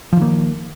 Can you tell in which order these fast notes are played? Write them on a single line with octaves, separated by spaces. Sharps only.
F3 D#3 A#3